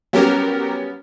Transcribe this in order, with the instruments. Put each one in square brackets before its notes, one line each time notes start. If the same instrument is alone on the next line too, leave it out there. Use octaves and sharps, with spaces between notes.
[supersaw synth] F#3 G4 A#4 [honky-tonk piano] G3 B3 C#4